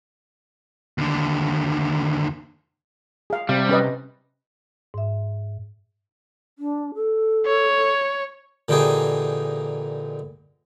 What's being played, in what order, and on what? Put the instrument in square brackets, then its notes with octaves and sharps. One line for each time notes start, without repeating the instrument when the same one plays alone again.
[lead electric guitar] D#2 D3
[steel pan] G#4 F5
[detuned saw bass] C3 [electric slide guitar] G3 [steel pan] F5
[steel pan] C#4 B4 D#5
[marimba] G#2 E5
[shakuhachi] D4
A4
[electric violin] C#5
[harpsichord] A#2 D3 E3 D#4 G4 G#4